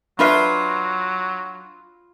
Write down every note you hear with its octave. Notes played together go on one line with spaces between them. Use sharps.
F#3 D4 F4 B4 E5 B5 F6 C7